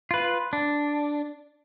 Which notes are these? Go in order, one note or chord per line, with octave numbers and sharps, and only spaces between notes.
F4 B4
D4